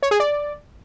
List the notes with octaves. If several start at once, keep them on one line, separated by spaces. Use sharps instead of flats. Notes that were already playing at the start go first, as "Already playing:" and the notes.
C#5
G#4
D5